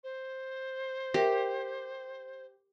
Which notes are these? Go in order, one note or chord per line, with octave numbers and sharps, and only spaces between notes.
C5
G4 A#4 E5 G5